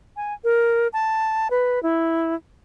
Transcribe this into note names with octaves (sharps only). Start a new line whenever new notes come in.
G#5
A#4
A5
B4
E4